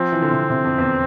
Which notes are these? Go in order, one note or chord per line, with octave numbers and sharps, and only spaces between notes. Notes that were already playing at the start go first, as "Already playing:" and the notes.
Already playing: F3 C4
E3
D3
C3
C3
F2
E2